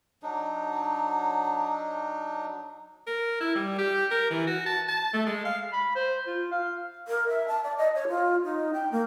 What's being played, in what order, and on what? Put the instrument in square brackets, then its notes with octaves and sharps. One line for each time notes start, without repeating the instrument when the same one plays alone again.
[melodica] F#3 D4 D#4
[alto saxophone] A#4
E4
G3
G4
A#4
E3
F#4
A5
A5
A3
G#3
F5
[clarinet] B5
C5
F4
F5
[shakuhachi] A#4
E5
A5
D5
D#5
C#5
F4
D#4
G5
A#3